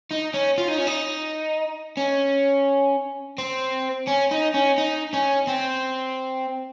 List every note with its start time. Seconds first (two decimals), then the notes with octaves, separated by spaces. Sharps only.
0.11 D#4
0.34 C#4
0.58 F4
0.68 D#4
0.78 C#4
0.87 D#4
1.97 C#4
3.38 C4
4.08 C#4
4.31 D#4
4.54 C#4
4.78 D#4
5.14 C#4
5.48 C4